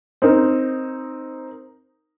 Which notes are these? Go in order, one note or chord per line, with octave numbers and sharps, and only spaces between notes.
C4 D#4 A#4